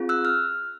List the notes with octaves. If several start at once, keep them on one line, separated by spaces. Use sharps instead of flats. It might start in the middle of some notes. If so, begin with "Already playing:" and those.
Already playing: C4 F4 G#4
E6 F#6
F6